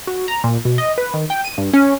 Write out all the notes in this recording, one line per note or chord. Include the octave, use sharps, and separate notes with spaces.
F#4
A#5
A#2
B2
D#5
B4
D#3
G5
D#7
G2
C#4